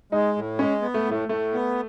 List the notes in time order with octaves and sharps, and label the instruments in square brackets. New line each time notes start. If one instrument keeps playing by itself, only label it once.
[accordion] G#3 [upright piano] D#4
[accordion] A2
[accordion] G#3 [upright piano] C#4
[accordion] B3
[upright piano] A3
[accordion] A2
[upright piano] A3
[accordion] A2 [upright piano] A3
[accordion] B3